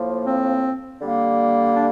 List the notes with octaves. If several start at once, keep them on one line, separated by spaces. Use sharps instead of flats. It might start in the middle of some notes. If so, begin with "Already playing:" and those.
Already playing: A2 F3 A#3
C4
D3 G3 A#3
D4